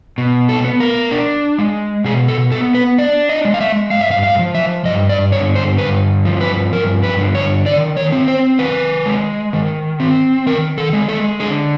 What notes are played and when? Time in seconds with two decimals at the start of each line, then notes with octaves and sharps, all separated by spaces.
0.18 B2
0.49 A4
0.65 B3
0.80 A#4
1.11 D4
1.59 G#3
2.05 B2 G#4
2.28 A4
2.52 B3 A4
2.75 B4
2.99 D4 D5
3.29 D#5
3.45 G#3
3.54 F5
3.61 E5
3.91 G2 F5
4.01 E5
4.11 F5
4.24 F5
4.39 F3
4.55 E5
4.85 G2 D#5
5.09 D5
5.32 D3 C#5
5.55 C5
5.78 G2 B4
6.25 F3
6.41 B4
6.72 G2 A#4
7.03 B4
7.19 D3
7.35 C#5
7.66 D#3 D5
7.97 C#5
8.12 C4
8.28 C5
8.59 D#3 B4
9.06 G#3
9.53 D#3
10.00 C4
10.46 D#3 A#4
10.78 A4
10.93 G#3
11.09 A4
11.40 D3 G#4